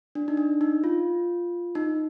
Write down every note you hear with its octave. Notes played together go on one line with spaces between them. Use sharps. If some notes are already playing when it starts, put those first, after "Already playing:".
D4
D#4
D4
D#4
F4
D#4